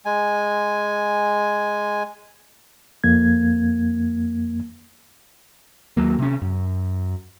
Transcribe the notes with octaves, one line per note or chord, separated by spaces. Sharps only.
G#3 G#5
F2 A#3 G#6
D#2 F#3 A#3
C3 C#4
F#2